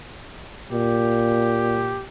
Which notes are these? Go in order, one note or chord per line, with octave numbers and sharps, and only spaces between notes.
A#2 G4